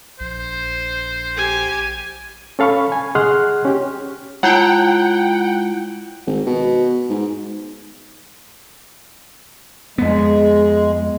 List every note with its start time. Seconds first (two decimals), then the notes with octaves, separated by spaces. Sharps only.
0.20 A#1 C5
1.36 G4 G#5
2.59 C#4 A4 F5 B5 C#6
2.92 G#5
3.15 G#4 D#5 F#5 C6 F6 F#6
3.65 C#4 G4
4.43 G#3 E4 F4 F#5 G5
6.26 G#1
6.47 B2
7.09 G#2
9.98 F2 G#3 B3